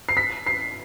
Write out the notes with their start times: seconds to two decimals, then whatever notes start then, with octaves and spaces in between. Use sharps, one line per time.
0.09 C7
0.17 B6
0.46 C7